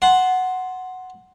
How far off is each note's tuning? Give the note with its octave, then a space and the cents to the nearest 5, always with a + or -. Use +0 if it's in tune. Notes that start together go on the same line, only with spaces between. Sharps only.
F#5 +0 A5 -25 C6 +0